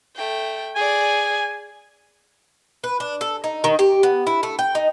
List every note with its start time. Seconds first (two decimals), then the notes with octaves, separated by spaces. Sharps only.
0.16 A3 G5
0.76 G#4 D5 G#5
2.84 B4
3.00 D4
3.21 A4
3.44 D#4
3.64 D#3
3.79 G4
4.03 B3
4.27 E4
4.43 A3
4.59 G5
4.75 D#4